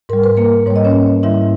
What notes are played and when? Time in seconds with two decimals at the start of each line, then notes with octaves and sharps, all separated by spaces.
0.09 G#2 G3 A#4
0.24 B4
0.37 A#3 A#4
0.66 G#2 G3 C#5
0.76 D#5
0.85 C#4 C#5
1.23 G#2 D#3 G3 E4 E5